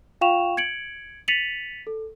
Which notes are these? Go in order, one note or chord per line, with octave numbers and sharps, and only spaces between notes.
F4 F5 G5 C#6 E7 F7
G#6 C#7 D7 F#7
A6 B6 C#7 D#7 F7 F#7
A4